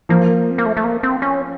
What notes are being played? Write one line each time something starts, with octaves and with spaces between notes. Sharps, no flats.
F3 A#3
C4
A#3
A3
A3
A#3
C4
C#4